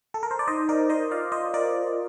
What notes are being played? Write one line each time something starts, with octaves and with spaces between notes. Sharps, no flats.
A4
A#4
C5
D5
D#4 C5 D#5
A#4 D5
C5 D#5
F4 D5 F5
C5 D#5
A#4 D5